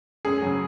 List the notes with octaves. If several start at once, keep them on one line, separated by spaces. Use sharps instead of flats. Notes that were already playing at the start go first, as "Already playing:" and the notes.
F#2 G#4
C#3 F#3